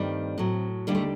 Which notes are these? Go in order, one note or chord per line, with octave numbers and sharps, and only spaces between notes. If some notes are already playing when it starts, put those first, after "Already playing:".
Already playing: G2 D#3 G3 A3 C4
A2 F#3
D#2 D3 G3 A#3
A3